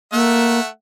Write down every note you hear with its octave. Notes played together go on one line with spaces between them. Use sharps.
A3 A#3 E5 F#5